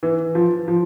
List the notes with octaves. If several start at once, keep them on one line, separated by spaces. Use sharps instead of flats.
E3
F3
F3